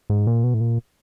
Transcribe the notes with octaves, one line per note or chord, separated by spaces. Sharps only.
G#2
A#2
B2
A2
A#2